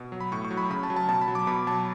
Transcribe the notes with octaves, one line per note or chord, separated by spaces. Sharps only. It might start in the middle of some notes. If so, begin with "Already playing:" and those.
Already playing: B2
F#3
B5
A2 C#6
C#6
F#3
B5
C#3 B5
A5
F#3
A5
B2 A5
B5
F#3
D6
B2 B5
F#3 A5